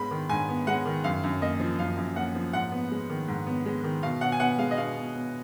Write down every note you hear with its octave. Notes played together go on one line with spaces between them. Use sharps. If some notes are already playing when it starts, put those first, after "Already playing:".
Already playing: G#2 G#3 B3 B5
D#3
G#2 G#5
B3
G#3 F#5
D#3
F#2 F5
F#2
A#3 D#5
F3
F#2 F5
F#2
A#3 F#5
F3
G#2 F#5
B3
G#3
D#3
G#2
B3
G#3
D#3
B2 F5
B2 F#5
G#5
B3 F#5
G#3 F5
D#5
B2 F5
B2
B3